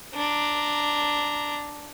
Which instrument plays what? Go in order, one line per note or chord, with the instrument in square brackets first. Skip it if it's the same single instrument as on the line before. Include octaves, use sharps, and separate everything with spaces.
[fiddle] D4 A#5